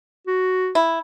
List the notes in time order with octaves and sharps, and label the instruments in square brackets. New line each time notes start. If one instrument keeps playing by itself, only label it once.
[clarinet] F#4
[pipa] E4